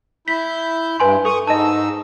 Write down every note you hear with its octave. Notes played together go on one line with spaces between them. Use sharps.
E4 G6 B6
G2 B4 G#5 C6
A4 C#6 D#6
G#2 D#4 D#5 A5 E6